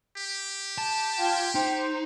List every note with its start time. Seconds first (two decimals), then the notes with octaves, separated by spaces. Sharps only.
0.17 G4
0.78 A5
1.18 F4 G5 G6 G#6
1.55 D#4 C5